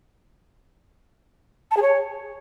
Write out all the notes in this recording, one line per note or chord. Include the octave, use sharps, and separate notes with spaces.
A5
G#4
C#5